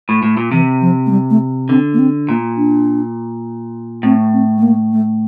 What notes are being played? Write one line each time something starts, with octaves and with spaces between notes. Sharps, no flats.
A2
A2
A#2
C3 E3
F3
A3
G3
A3
D3 C4
A#3
C4
A#2 A#3
D4
A2 C4
C4
A3
A#3
A3